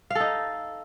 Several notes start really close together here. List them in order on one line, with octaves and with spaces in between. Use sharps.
F5 A4 D#4